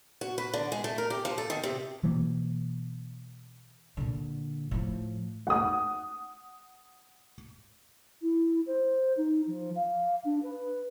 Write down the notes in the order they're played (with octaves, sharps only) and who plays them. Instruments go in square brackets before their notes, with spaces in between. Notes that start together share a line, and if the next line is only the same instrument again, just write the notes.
[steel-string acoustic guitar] F#4
B4
D3
G#3
A3
A#4
G4
F3
A4
D#3
C3
[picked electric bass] B2 E3 F#3 A#3
[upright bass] A#2 D3
A2 F3
[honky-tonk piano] F#5 D#6
[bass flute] E4
C5
D#4
F3
F5
D4
B4